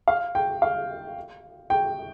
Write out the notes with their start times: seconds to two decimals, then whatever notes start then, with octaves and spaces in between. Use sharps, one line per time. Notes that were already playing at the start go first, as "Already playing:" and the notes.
0.08 F5
0.35 G5
0.62 F5
1.70 G5